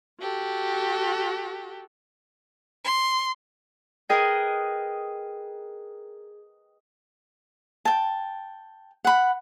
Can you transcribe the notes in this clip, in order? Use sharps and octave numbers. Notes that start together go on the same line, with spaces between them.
F#4 G4 A4
C6
G#4 A#4 B4 D#5 G5
G5 A5
F#5 B5